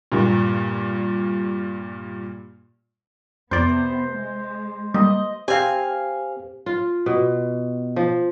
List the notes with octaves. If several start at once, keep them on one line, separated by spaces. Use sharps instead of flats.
G2 A#2
F2 C3 B3 C5 D5
G#3
G3 A#3 D#5
C4 G4 F5 G#5
F4
B2
F3